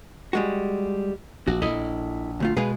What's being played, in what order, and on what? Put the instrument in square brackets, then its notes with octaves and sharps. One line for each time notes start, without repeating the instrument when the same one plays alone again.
[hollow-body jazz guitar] G3 G#3 F#4
[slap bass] A#1 [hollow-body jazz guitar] F#4
[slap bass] A#1 [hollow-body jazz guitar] E4 A4 D#5
[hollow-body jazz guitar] D2 A3 F4
[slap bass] B2 G#3 [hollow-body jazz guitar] G#4 B4 F5